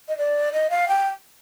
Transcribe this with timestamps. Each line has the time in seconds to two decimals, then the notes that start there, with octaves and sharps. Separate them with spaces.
0.08 D#5
0.18 D5
0.53 D#5
0.70 F5
0.88 G5